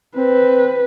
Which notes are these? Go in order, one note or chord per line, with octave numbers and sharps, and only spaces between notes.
C4 B4